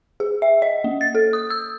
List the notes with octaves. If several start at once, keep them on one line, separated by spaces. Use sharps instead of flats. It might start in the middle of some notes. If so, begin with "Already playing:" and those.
G#4
E5
D#5
A#3
A6
A4
D#6
E6